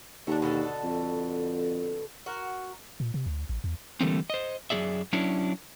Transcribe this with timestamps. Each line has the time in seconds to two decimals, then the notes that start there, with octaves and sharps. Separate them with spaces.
0.27 D#2 A3 D4
0.42 B2 D3 A4
0.84 F2
2.26 F#4 A#4
3.00 A#2
3.14 C3
3.27 D2
3.49 A1
3.64 E2
4.01 D3 E3 G3 A3 A#3 C4
4.30 C5 D#5
4.70 F#2 A#3 G#4 D5 E5
5.13 F#3 C#4 D4 E4